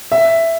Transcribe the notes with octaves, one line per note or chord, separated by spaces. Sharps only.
E5